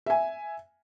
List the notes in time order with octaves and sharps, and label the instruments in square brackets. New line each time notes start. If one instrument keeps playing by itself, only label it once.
[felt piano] E5 G#5